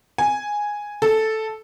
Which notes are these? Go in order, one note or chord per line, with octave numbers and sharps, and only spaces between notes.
G#5
A4